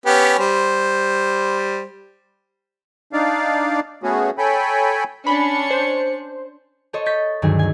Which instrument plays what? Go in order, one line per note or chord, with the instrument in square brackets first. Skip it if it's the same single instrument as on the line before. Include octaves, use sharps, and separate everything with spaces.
[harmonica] B3 C#4 G4
G3 C5
[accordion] D4 D#4 D5 F5
A3 B3 C#4 F#4 G#4
A4 C#5 G5 G#5 B5
[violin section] C#4 D4 C#7 [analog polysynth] B5
[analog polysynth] C5
[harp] A4 C5 C#5 D#5
C#6 G6 A6 B6
D2 G2 D#3 F#3 G#4
F#3 G#5